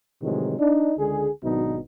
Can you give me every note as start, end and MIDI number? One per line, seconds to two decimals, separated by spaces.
0.22 0.59 45
0.22 0.59 48
0.22 0.59 51
0.22 0.59 52
0.22 0.59 54
0.22 0.59 56
0.59 0.92 62
0.59 0.92 63
0.98 1.28 37
0.98 1.28 50
0.98 1.28 56
0.98 1.28 68
1.44 1.79 32
1.44 1.79 47
1.44 1.79 54
1.44 1.79 59
1.44 1.79 62
1.44 1.79 63